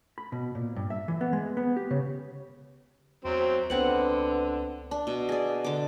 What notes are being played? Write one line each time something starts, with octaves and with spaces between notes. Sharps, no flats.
B5
B2
A#2
G2
E5
E3
B3
G#3
B3
G4
C#3
E2 F#3 C4
C#2 D3 B3 C4 B4 F#5
D4
B2
G#4 D5
D3 D6